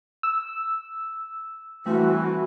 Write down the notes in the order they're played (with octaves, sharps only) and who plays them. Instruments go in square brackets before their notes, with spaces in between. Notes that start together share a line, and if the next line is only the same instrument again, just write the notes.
[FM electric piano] E6
[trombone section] E3 [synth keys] G3 A3 C4 [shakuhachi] F#4